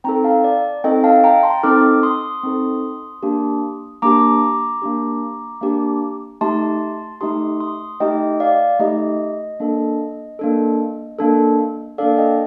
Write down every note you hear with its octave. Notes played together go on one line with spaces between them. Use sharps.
C4 D#4 A4 G5 A#5
F5 A5
D5
C4 D#4 A4 D#5 G5
F5 A5
G5 A#5
A5 C6
C4 D#4 A4 D6 F6
C6 D#6
C4 D#4 A4
A#3 D4 G4
A#3 D4 G4 A#5 D6
A#3 D4 G4
A#3 D4 G4
A3 D#4 G4 A5 C6
A3 D#4 G4 C6 D#6
C6 D#6
A3 D#4 G4 D#5 G5
D5 F5
A3 D#4 G4 D#5
A#3 D4 A4
A#3 D4 A4
A#3 D4 A4
A#3 D4 A4 D5 F5
D#5 G5